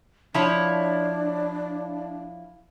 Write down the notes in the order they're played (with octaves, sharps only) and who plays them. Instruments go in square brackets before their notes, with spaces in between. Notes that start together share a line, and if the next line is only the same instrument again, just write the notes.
[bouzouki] F3 E4 C#5 [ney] D4